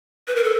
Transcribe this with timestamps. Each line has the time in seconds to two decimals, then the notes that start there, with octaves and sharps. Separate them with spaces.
0.28 B4
0.36 A#4
0.44 A4